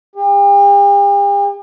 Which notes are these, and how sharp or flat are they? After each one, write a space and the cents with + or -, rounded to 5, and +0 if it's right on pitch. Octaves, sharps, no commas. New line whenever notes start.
G4 +45